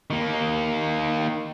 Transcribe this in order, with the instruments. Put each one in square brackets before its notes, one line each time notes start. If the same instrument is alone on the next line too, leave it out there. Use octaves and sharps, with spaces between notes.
[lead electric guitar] D#3 A#3